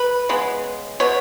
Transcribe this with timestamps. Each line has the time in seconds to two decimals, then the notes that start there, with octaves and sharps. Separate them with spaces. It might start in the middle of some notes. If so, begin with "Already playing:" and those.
Already playing: B4
0.29 C#3 G#3 B3
1.00 B2 B3 C#5